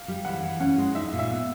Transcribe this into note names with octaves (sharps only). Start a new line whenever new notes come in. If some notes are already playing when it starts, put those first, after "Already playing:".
Already playing: F5
G3
E3 F#5
E3
C#4 F#5
G#3
D#4 E5
A#2
E5
B3